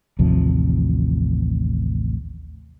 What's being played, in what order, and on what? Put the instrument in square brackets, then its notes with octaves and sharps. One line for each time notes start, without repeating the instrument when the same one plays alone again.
[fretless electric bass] A1 D#2 C3 F3